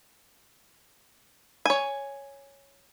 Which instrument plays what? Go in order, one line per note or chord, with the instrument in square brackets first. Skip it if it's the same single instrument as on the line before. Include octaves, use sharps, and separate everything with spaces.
[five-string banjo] C#5 G#5